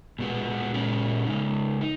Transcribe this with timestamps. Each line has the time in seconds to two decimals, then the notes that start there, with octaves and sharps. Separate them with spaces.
0.19 A#2 G#3 B3 F#4
0.74 A#2 G#3 C#4 F#4
1.27 C#3 G#3 D#4
1.81 D#4